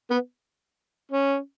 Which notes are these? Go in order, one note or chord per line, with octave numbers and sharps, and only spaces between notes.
B3
C#4